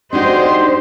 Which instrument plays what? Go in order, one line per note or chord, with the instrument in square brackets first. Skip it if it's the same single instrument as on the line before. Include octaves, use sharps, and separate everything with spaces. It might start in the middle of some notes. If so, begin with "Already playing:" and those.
[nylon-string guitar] D4 D#4 F#4 [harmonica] G4 D#5 C6 [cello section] C5